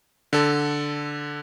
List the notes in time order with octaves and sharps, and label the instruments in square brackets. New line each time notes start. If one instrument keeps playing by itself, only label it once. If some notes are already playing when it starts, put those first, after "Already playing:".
[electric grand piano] D3 A4